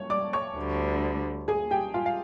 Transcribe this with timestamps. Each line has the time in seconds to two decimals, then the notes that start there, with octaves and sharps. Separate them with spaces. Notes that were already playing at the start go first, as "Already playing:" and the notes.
Already playing: C#5 C#6
0.10 D5 D6
0.33 C#5 C#6
0.57 D2 D3 G3
1.48 G#4 G#5
1.71 G4 G5
1.94 F4 F5
2.06 F5